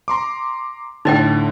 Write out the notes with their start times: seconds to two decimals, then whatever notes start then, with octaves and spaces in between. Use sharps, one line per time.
0.08 A#5 C6 D6
1.05 A2 D3 D#4 D#5 G5